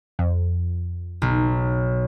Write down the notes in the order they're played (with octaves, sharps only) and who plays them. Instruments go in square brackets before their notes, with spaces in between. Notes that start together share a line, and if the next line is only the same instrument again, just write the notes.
[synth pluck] F2
[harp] B1